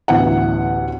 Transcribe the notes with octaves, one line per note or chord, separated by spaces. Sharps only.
A1 D2 B3 E4 F#5